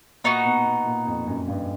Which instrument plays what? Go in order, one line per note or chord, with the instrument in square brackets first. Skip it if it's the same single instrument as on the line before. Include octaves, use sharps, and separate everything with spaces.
[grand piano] A#2 [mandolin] B3 D#4 F#4
[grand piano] B2
B2
A#2
F2
F#2
G2